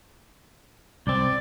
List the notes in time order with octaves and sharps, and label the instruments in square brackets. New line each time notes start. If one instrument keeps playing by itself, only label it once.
[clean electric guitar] C2 C4 [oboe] D5